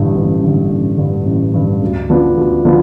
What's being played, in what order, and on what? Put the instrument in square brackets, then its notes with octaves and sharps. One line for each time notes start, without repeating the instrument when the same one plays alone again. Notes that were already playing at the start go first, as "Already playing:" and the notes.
Already playing: [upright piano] A1 G2 D3
A1
G2 D3
A1
G2 D3
A1
G2 D3
D2
D3 F3 B3 D4
D2
D3 F3 B3 D4